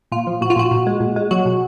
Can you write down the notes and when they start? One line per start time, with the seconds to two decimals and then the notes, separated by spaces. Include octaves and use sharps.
0.12 A#2 F4
0.27 F3
0.41 A#2 F#4
0.50 F4
0.56 A#2 F#4
0.71 A#2
0.87 G#3
1.00 A#2
1.16 G#3
1.31 F#3 F#4
1.46 B2